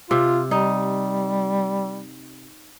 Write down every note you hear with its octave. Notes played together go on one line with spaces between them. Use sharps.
C3 F4
G3 D#4